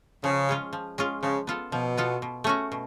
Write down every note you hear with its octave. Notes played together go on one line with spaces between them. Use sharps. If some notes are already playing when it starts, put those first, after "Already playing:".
C#3 F3
G#3 C#4 F4
F3
G#3 C#4 F4
C#3 F3
B3 F4 A4
B2 F3
B3 F4 A4
B2
A3 C#4 F#4
B2